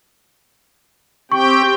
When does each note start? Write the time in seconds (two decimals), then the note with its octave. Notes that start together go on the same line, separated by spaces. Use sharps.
1.32 C4 G4 G5 C#6